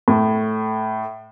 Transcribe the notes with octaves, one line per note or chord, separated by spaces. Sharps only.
A2